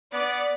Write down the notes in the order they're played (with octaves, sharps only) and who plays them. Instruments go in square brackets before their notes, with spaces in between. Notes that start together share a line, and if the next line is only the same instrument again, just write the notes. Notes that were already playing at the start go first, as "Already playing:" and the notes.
[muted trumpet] B3 [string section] D5